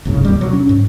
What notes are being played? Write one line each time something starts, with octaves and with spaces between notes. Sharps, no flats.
F#1 C2 G#2 C#3
D#2 G3
B2 F#3
C#4
G#2